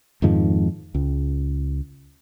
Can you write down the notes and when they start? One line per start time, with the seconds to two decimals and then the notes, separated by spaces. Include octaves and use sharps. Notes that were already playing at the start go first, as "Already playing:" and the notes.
0.22 F2 G#2 D#3 F3
0.95 C#2